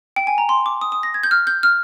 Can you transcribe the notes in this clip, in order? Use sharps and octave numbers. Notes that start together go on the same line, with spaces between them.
G5
G#5
A#5
C6
D6
D#6
D#6
A#6
G#6
G6
F6
G6
F6